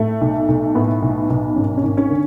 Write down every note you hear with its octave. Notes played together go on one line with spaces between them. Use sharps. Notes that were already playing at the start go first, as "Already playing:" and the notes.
Already playing: A2 A3
B1
B1
A2 B3
B1
B1
G#1 C#4
C#4
G#1
C#4
D3